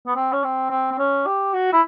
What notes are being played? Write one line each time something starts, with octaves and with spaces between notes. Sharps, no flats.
B3
C4
C#4
C4
C4
C4
C#4
G4
F#4
E4